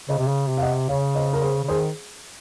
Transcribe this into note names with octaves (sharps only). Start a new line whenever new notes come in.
C#3 C5 D#5
C3
C#3
C3
F5
D#5 F#5
C#3 C#5 F5
C5 D#5
A#4
G#4 C5
C#3
D#3 G#4 C5